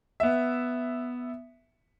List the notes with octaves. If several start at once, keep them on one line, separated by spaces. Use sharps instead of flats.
B3 E5